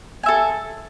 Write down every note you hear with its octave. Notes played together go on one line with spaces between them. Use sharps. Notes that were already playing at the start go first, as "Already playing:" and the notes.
A4 E5 G#5